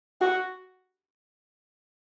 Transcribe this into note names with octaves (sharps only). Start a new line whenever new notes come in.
F#4